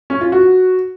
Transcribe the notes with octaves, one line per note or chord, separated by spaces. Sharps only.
C#4
F4
F#4